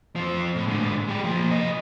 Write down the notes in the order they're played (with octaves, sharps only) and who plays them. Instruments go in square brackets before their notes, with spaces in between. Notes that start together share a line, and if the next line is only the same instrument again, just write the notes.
[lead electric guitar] F3 C4
A2
G#2 D3
G#3 G4
F3 A#3
C3 D#5